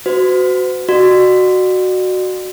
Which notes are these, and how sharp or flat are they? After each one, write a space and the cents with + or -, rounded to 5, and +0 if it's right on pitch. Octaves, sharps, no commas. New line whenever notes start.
F#4 +0 C5 -45
F#4 +0 D5 +45